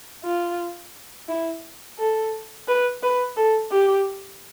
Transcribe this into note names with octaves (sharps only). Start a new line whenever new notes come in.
F4
E4
A4
B4
B4
A4
G4